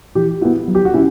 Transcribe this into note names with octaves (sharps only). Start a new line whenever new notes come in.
E3 G4
B3 E4 F#4
F#3
G4
F#4
C#4 E4